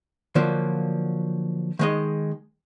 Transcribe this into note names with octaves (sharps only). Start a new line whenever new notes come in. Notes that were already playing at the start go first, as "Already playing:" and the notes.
D3 F3 F#3 A#3 F4
D#3 G#3 D#5